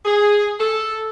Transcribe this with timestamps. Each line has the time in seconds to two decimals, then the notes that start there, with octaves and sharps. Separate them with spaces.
0.05 G#4
0.59 A4